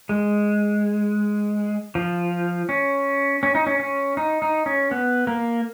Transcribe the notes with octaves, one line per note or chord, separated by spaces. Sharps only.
G#3
F3
C#4
C#4
D#4
C#4
C#4
D#4
D#4
C#4
B3
A#3